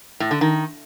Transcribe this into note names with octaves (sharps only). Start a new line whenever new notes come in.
A2
D3
D#3